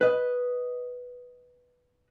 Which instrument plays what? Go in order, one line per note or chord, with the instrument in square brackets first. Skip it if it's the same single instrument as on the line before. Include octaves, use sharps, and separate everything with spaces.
[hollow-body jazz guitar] B4 D#5